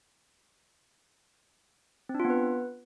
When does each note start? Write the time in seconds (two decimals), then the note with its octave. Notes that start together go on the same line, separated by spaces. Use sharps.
2.09 C4
2.14 D4
2.20 F4
2.25 B3
2.30 B4